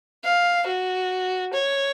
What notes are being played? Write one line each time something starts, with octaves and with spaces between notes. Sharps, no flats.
F5
F#4
C#5